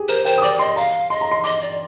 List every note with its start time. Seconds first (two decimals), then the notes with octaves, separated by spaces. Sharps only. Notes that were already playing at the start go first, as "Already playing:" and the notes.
Already playing: G4 G#4
0.08 A#4 C5
0.25 C5 G5
0.38 D#6
0.42 D5 D6
0.59 D#5 C6
0.76 F5 A#5
1.10 D#5 C6
1.21 A#5
1.31 C6
1.44 D#5 D6
1.62 D5